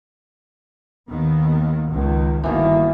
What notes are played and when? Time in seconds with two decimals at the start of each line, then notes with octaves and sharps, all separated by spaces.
1.09 D#2 D#3 B3
1.91 C#2 D#3
2.43 G1 B2 D#3 E3 A#3